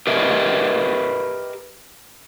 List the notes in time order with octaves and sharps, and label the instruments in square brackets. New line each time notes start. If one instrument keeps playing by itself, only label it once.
[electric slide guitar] G4 A#4 B4 D#5 E5